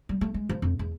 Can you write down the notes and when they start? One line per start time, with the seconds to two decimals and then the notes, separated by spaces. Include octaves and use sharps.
0.09 G3
0.21 A3
0.34 G#3
0.49 F3
0.62 F2
0.79 E2